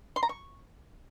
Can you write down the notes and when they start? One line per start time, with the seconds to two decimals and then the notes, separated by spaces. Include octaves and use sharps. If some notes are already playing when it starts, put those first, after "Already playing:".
0.16 C6
0.23 A#5
0.29 C#6